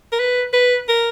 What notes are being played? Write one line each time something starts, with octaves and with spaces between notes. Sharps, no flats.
A#4
B4
B4
A#4